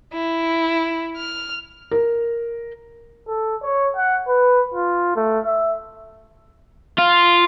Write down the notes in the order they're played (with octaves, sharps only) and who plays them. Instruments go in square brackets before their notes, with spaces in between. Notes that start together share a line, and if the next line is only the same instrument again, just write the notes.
[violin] E4
F6
[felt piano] A#4
[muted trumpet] A4
C#5
F#5
B4
F4
A3
E5
[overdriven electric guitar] F4